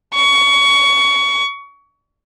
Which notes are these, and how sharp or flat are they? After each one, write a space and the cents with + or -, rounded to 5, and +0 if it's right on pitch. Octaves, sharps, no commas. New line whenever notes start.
C#6 +20